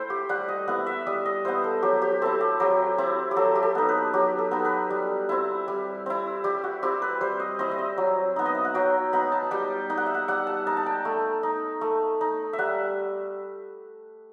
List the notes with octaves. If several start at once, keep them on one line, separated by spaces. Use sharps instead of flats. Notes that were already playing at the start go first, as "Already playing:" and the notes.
Already playing: A3 E4 C5 G5
G4
G3 F#5
D#5
B3 E4 F#5
E5
G3 D#5
D#5
B3 E4 C5
A4
F#3 G4
G4
C4 E4 A4
G4
F#3 G4
C4 E4
G4
F#3 A4
G4
A4
B3 D#4
B4
F#3 G4
A4
B3 D#4
B4
G3
C4 E4
G3
C4 E4
G3 G4
F#4
C4 E4 G4
B4
G3 C5
D#5
C4 E4 D#5
D#5
E5
F#3
B3 D#4
D#5
E5
F#5
F#3 G5
B3 D#4 B5
A5
G3 G5
D#4 G5
F#5
E5
F#5
G3 F#5
A5
D#4 A5
A5
G5
A3
D#4
A3
D#4
E5
G3 F#5